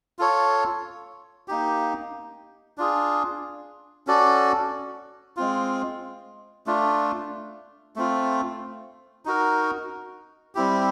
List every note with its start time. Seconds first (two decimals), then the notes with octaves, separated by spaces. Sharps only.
0.19 F4 A4 C#5
1.48 A#3 D#4 G4
2.78 D4 F4 G#4
4.07 C#4 F#4 A4 D5
5.37 G#3 C4 F4
6.66 A3 D4 F4
7.96 A3 C4 F4
9.25 D#4 F#4 A#4
10.55 G3 C4 E4 G4